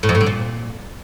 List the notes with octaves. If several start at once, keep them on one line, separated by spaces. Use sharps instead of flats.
A2
F2
A2
D3
A#2